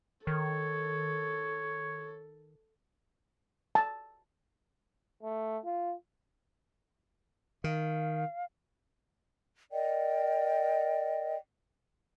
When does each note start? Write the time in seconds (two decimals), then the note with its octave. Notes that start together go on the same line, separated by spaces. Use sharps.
0.27 D#3 A4 C#5
3.75 A5
5.23 A3
5.65 F4
7.64 D#3 F5
9.72 A#4 D5 D#5 G5